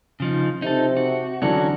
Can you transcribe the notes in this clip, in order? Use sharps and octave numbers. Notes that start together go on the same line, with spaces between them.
C#3 F3 D#4
C3 D#4 A4
F#4
D3 E3 F#3 C#4 D4 F#4